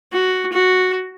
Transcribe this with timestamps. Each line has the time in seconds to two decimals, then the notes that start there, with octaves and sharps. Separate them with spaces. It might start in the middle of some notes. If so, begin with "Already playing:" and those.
0.12 F#4
0.52 F#4